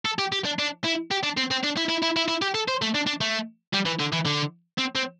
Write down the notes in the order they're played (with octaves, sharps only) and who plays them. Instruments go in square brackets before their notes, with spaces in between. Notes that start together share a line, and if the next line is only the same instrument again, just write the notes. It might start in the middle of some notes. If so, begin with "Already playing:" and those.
[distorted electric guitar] A4
G4
G4
D4
D4
E4
G4
D4
C4
C4
D4
E4
E4
E4
E4
E4
G4
A4
C5
A3
D4
D4
A3
G3
E3
D3
E3
D3
C4
C4